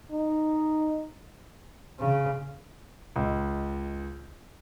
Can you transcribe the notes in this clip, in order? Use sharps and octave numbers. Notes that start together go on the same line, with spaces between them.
D#4
C#3
C#2